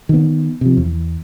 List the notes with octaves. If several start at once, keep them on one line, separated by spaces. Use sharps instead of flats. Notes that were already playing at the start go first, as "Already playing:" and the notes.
D#3 B3
C3 F3
E2